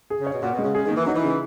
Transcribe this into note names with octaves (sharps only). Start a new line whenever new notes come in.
G#4
C#3
C#5
B2
A#2 F#4
B2
G#3
C#3
C#3 G#4
D#3
A#3
E3
F#3 D#4
E3
C#3